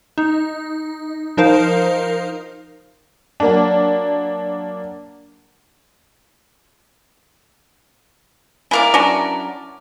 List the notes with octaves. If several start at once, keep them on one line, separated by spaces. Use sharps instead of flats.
D#4
F3 D#4 A#4 C5 F5
F#3 A#3 D4
G#3 A#3 E4 A#4 D5
F#3 C#4 D4